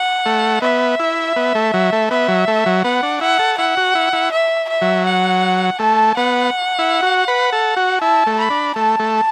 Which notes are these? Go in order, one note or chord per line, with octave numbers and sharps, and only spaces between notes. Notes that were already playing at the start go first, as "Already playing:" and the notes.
Already playing: F#5
A3
B3 E5
E4
B3
A3
F#3
A3
B3 E5
F#3
A3
F#3
B3 F#5
D4
E4 F#5
A4
E4 F#5
F#4
E4
E4
E5
E5
F#3
F#5
A3 A5
B3 F#5
E4
F#4
B4
A4
F#4
E4 A5
A3
B5
D4
A3 A5
A3